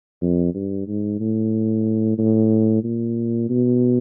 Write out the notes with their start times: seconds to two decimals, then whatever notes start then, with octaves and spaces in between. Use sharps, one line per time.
0.22 F2
0.54 G2
0.87 G#2
1.20 A2
2.18 A2
2.84 A#2
3.49 B2